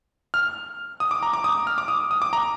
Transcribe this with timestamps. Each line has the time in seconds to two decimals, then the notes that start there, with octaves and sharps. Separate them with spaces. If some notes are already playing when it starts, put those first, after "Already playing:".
0.34 F6
1.00 D#6
1.11 D6
1.23 A#5
1.33 D6
1.44 D#6
1.67 F6
1.78 D6
1.88 D#6
2.11 D#6
2.22 D6
2.33 A#5